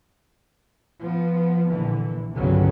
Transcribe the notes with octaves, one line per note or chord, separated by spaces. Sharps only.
F3 B3
A#1 D3 E3
G1 C2 G2 C#3 F#3 B3